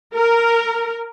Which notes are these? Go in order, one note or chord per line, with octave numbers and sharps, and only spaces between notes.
A#4